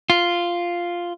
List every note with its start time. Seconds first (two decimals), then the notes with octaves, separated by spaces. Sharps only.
0.10 F4